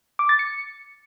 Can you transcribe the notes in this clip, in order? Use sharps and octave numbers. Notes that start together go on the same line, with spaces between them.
D6
A6
C#7